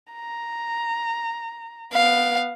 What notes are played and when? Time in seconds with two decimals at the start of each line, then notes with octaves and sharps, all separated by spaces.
0.13 A#5
1.93 B3 F5